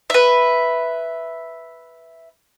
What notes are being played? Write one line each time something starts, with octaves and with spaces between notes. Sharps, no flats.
B4 E5